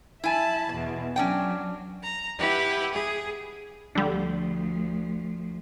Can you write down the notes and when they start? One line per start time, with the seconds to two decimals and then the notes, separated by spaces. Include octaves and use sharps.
0.24 E4 E5 G#5 A5 B5
0.71 E2 B2
1.16 F#3 C#4 D4 G5
2.03 A#5 A#6
2.38 E4 G4 B4 F#5 G5
2.93 G#4
3.95 D2 D3 F3 G3